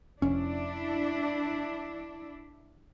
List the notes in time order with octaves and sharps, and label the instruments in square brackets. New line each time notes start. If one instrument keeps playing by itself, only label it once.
[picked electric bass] F1 C#4 [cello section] D4 E4